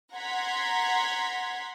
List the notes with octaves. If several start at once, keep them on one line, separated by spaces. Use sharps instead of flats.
F#5 A#5 C6 G#6 B6